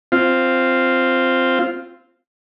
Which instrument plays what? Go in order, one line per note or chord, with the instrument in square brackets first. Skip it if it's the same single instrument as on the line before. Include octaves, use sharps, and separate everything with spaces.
[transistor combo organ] C4 F4